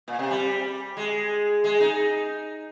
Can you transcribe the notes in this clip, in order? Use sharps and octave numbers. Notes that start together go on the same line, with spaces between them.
A#2
C3
G3
G#3
G#3
D#4